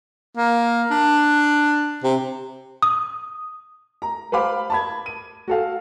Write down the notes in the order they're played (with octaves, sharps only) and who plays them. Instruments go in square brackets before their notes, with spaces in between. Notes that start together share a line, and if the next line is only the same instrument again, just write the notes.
[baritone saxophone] A#3
D4
C3
[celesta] D#6
[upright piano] A#5
B4 C5 F5 B5 D6
A5 B5 G#6
D#7
F#4 A4 F5